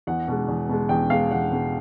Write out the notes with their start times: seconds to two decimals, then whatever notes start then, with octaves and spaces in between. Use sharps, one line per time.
0.07 E2 F#5
0.28 B2 G#3
0.48 E2
0.69 B2 G#3
0.89 E2 G5
1.10 B2 G#3 F5
1.31 E2 F#5
1.52 B2 G#3